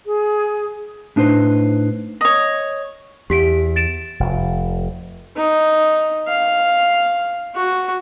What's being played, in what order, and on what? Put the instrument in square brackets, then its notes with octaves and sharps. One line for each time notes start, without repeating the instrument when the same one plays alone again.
[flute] G#4
[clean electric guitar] A2 D4 D#4 B4 C5
[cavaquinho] C#5 D#5
[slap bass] E2 [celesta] G4 B6 D7
[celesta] A6 D7 E7
[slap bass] F1
[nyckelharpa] D#4
F5
F#4